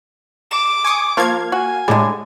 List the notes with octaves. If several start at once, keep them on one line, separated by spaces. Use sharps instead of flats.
D6 E7
G#5 C#6 D#6
F3 A#3 F5 C#6 G#6
F#4 G#5
A2 D3 G3 G#3